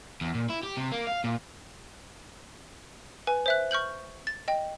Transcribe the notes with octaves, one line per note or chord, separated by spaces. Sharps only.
E2
A#2
E4
G4
C3
A#3
F5
A#2
B4 G#5
C5 E5 F#6
C#6 F6 G6 F#7
A6
D#5 G5